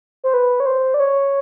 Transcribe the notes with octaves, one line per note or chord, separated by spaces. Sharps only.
C5
B4
C#5
C5
D5
C#5